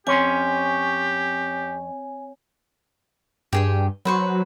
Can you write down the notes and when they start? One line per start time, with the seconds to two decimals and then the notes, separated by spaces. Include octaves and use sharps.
0.07 F2 C4 C#4 G4 C#5 G#5 C6
3.53 G2 G4 G#4 G5
4.05 F#3 B4 C5 C#6